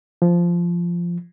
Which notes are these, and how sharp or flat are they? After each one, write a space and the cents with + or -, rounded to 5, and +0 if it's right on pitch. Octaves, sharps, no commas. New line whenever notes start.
F3 -10